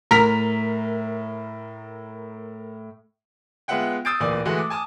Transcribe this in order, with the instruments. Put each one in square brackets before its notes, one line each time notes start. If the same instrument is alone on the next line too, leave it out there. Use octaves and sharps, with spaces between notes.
[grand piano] A2 B6 F7 [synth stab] A#4
[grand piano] G#3 B3 F4 E5 F#5 G5
D#6 E6 G6 A6 C7 D7
D1 A#2 E3 D5
E3 G#3 A3 F#4
D6
G#5 A5 D6 D#6